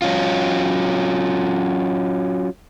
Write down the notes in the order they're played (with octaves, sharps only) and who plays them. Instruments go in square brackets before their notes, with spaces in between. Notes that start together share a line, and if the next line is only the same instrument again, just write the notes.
[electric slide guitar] F#3 C#4 F4